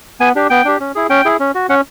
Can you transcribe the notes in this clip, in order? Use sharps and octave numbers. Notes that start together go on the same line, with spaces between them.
B3 G#5
D4 G4
B3 G5
D4 G4
C#4
E4 G#4
C#4 G5
E4 G#4
C#4
F#4
C#4 F#5